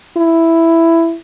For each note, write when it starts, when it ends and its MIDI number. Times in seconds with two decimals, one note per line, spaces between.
0.17 1.16 64